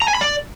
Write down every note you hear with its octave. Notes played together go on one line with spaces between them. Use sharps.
A#5
G#5
B5
D5